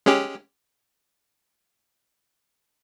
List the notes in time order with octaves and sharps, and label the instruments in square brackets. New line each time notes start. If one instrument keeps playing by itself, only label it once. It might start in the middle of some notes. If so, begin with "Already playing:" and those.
[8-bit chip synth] G#3 C#4 G4